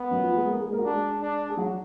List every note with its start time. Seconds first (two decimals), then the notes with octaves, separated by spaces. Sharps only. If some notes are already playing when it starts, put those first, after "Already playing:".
Already playing: B3
0.10 F#2 F#3
0.23 F3 F4
0.35 G#3 G#4
0.47 A#3 A#4
0.59 G#3 G#4
0.72 A#3 A#4
0.78 F#4
0.84 G#3 D4 G#4
1.21 D4
1.49 G#4
1.57 F#3 F#4